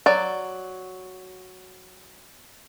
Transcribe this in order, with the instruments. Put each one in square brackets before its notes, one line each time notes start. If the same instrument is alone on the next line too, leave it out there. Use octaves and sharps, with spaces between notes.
[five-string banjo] F#3 D5